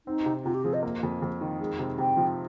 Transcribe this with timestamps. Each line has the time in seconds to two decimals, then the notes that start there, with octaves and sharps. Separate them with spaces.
0.06 C4 D#4
0.26 C3
0.45 C3 F4
0.54 G4
0.64 F3 G#4
0.74 D#5
0.83 A#3
1.03 F2
1.22 F2
1.41 D#3
1.60 G#3
1.79 C3
1.98 C3 G5
2.17 F3